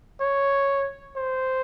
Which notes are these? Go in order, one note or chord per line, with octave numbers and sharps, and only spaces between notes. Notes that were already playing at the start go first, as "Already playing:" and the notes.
C#5
C5